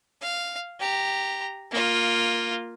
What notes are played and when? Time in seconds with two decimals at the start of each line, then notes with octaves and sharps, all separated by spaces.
0.22 F5
0.80 G4 A#5
1.72 A#3 F4